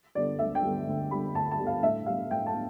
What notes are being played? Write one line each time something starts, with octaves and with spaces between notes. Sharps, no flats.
D3 G3 B3 D5
D2 E5
G5
D3 G3 B3
D2
D3 G3 B3 B5
D2 A5
A5
D3 G3 B3
F5
A2 E5
G3 B3 F5
A2 G5
A5
B3